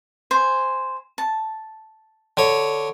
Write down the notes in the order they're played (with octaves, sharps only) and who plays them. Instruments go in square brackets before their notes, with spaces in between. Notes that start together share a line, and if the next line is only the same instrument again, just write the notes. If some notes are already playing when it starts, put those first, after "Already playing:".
[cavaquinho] C5 G#5
A5
[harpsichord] D3 C#5